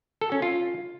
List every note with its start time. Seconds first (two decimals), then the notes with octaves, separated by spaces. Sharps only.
0.21 A4
0.32 C#4
0.42 F4